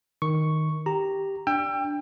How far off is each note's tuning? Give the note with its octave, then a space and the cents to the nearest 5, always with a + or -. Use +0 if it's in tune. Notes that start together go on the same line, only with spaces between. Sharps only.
D#3 +0 C#6 +0
G4 +0 A#5 -5
D4 -5 G5 +20 E6 +30